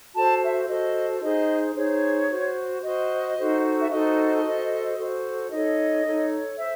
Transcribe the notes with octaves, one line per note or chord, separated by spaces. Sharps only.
F#4 A4 C5 A5
E5
F#4 A4 C5 D#5
D#4 G#4 C5 D#5
D#4 G#4 C5 C#5
F#4 C5
F#4 C5 D#5
D#4 F#4 A4 C5
E5
D#4 F#4 A4 C5 D#5
F#4 A4 C5
F#4 A4 C5
D#4 A4 C#5 D#5
D#4 A4 C#5
C5 E5